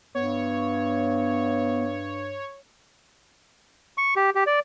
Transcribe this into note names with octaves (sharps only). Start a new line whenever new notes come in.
G2 B3 C#5
C#6
G4
G4
D5